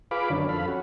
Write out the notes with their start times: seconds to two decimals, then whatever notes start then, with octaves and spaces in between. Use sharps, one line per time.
0.11 F4 G#4 B4 F5 B5 D6
0.30 F#2 D3 D#3 C#4 D4
0.49 F2 A4 F5 B5
0.68 C#4 F#4